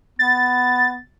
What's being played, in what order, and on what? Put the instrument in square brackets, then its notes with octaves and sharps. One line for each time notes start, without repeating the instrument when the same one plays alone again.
[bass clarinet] B3 [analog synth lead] A6